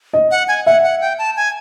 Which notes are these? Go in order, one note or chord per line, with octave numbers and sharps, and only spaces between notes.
D#5
F#5
G#5
E5 F#5
F#5
G5
A5
G#5